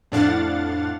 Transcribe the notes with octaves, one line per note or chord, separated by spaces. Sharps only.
F2 A2 D4 F5 F#5 A6